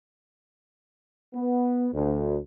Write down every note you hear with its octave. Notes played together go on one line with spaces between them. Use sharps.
B3
D2